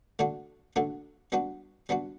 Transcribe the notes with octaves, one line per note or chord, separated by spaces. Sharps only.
D3 A3 D4 F#4
D3 A3 D4 F#4
G3 B3 D4 F#4
G3 B3 D4 F#4